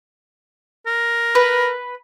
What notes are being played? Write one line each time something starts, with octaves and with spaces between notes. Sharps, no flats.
A#4
B4